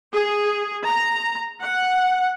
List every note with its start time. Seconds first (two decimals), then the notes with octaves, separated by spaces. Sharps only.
0.13 G#4
0.86 A#5
1.61 F#5